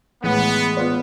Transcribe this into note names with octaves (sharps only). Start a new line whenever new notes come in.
A2 E3 G#3 B3
B3 F4 B4 D5